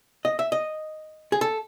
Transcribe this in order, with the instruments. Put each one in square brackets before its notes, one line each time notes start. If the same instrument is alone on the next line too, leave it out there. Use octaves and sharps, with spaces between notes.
[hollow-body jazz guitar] D#5
E5
D#5
G#4
A4